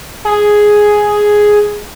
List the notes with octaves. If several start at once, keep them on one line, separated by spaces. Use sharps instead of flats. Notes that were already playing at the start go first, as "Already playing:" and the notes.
G#4